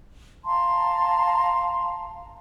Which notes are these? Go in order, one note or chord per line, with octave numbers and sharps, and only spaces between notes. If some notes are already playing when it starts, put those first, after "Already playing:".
F5 A5 A#5 C6